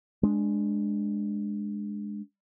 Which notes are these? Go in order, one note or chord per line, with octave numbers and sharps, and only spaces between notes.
G#3 D4